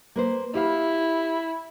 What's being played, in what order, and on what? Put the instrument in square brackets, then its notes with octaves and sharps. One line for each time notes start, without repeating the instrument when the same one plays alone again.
[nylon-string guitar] A#3 B4 C5
[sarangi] E4 [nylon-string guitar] G4 F5